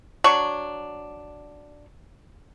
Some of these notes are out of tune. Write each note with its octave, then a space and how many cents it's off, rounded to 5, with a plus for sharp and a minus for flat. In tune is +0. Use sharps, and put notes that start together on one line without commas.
F#3 +0 D4 +0 C#6 +0